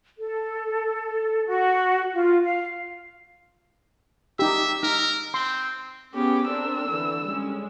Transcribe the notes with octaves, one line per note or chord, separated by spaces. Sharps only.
A4
F#4
F4
F5
D#4 G4 E5
D#4 A#4
C4 C6
B3 C#4 G4 G#4
C4 D4 A#4 E6
D3 E3
G3 G#3 C#4